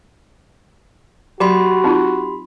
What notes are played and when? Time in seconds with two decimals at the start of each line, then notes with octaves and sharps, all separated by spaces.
1.40 F#3 F#4 G4 B5 C6
1.84 C4 D#4 F4